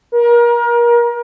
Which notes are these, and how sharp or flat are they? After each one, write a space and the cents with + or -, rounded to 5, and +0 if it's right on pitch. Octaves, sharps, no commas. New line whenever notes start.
A#4 +30